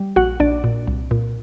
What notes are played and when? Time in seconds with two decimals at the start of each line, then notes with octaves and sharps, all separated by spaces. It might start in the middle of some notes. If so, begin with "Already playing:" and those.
Already playing: G3
0.16 A#1 F#4 F#5
0.40 A#1 D4 D5
0.64 A#2
0.87 C2
1.11 A#2